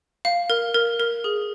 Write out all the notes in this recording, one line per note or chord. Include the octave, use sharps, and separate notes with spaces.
F5
A#4
A#4
A#4
G#4